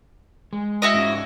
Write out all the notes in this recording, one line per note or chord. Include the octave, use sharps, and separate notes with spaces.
G#3
E4 F#4 D#5
G#2 C#4 F4